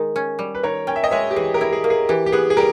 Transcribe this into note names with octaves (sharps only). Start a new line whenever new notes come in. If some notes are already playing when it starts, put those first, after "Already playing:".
Already playing: D#3 G#3
C#4
G3
B4
D#3 A#4 C#5
C#4 G5
E5
D#5 G5
G#3 C#5 E5
G4
E3 G#4
G4 A#4
E4
G#4
A#3
G#4
E3 G4
G4
B3 G#4
G#4
G3 G4 A#4